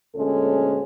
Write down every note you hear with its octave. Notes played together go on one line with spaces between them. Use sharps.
D2 A#2 G#3 C#4 A4